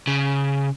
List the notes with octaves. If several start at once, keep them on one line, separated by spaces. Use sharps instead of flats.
C#3